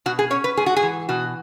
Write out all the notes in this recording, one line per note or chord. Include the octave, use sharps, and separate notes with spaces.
B2 F#4
G#4
C#4 C#5
B4
G#2 G#4
F#4
G#4
E3
B2 F#4